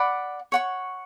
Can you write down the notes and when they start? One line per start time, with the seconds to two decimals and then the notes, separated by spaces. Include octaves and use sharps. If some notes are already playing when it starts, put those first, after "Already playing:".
Already playing: D5 F#5 B5 D6
0.52 C#5 F#5 C#6